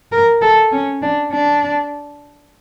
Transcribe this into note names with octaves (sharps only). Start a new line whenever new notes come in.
A#4
A4
C#4
D4
D4